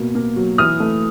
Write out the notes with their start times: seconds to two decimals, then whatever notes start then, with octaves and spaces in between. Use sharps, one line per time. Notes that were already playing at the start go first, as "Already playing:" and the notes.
Already playing: B2 A#3
0.15 A#3
0.36 F#3
0.58 E3 D#6 F6
0.80 A3